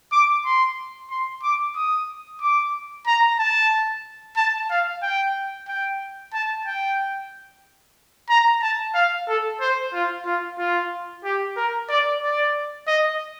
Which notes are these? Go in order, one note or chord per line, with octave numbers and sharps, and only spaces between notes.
D6
C6
C6
D6
D#6
D6
A#5
A5
A5
F5
G5
G5
A5
G5
A#5
A5
F5
A4
C5
F4
F4
F4
G4
A#4
D5
D5
D#5